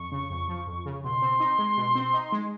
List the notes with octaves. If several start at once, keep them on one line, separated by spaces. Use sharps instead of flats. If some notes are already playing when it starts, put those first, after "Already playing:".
Already playing: F2 C#6
C#3
F2
F3
F2
C#3
B2 C6
C4
D#4
G#3
B2
C4
D#4
G#3